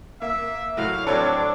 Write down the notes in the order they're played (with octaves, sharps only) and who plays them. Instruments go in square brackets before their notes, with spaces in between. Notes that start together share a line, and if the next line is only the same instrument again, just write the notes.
[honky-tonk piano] A#3 [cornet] E5
[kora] A2 F#3 [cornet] F#4 [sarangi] F5
[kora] F#3 C5 F5 [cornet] C4 [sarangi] D4 [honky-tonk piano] A4 C#5